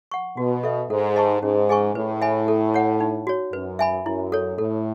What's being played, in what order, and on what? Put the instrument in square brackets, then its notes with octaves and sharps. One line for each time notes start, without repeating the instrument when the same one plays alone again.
[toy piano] F#5 C#6
[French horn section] B2 [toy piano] F#4
[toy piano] A4 E5
[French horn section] G#2 [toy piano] A4
[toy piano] D#5 A5 C#6
[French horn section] G#2 [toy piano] C#4
[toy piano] G#4 D#5 G#5 C#6
[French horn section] A2 [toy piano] B4
[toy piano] E5 G#5 B5
A4
C#5 F#5
D#4
F#4 C#5
[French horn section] F#2 [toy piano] B4
[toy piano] E5 G#5 B5
[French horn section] F#2 [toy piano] E4
[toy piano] A4 C#5
[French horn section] A2 [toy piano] A4